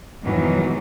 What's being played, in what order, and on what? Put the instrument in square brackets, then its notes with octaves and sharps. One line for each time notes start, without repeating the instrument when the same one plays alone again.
[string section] F2 G#2 B2 D#3 E3 F#3